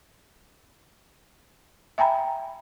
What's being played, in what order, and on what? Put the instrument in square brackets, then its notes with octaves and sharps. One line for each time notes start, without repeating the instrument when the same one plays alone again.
[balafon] E5 G5 G#5 A#5 B5